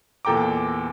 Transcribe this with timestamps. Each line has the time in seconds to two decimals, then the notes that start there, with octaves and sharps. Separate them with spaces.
0.25 E2 A#2 A4 G5 A#5 D6